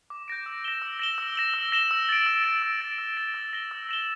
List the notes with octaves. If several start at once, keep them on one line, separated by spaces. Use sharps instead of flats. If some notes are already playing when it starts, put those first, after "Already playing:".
D6
G6 A#6 D7
E6
A#6 E7 G7
E6
A#6 E7 G7
E6
A#6 E7 G7
E6
A#6 E7 G7
E6
A6 D7
E6
A6 D7
E6
A6 D7
E6
A6 D7
E6
A#6 E7 G7
E6
A#6 E7 G7